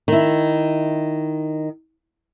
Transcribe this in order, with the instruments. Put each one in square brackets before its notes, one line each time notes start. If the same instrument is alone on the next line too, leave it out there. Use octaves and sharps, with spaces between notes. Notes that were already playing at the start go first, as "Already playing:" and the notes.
[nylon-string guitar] D#3 E4